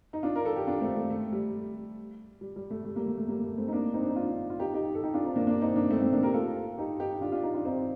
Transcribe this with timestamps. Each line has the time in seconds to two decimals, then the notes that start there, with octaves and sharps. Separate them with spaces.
0.13 D#4
0.23 D4 F4
0.36 A#4
0.45 A4
0.56 G4
0.67 D4 F4
0.81 A3 C4
0.96 A3
1.10 A3
1.32 G3
2.41 G3
2.56 G3
2.70 A3
2.85 A3
2.96 G3 A#3
3.07 A3
3.18 A3
3.28 G3 A#3
3.43 A3
3.57 A3 C4
3.68 D#4
3.72 A#3 D4
3.94 C4 D#4
4.02 D4
4.09 D#4
4.16 D4 F4
4.50 F4
4.59 D#4 G4
4.74 D#4 G4
4.95 A4
5.03 D#4 G4
5.14 D4 F4
5.25 C4 D#4
5.36 A#3 D4
5.47 A#3 D4
5.61 C4 D#4
5.76 A#3 D4
5.90 A3 C4
6.01 A3 C4
6.12 A#3 D4
6.23 G4 A#4
6.34 F4 A4
6.78 D#4 G4
7.00 D#4 G4
7.21 D4 F4
7.32 D4 F4
7.43 D#4 G4
7.54 D4 F4
7.65 C4 D#4